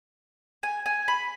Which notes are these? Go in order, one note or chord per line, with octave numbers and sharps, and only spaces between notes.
G#5
G#5
B5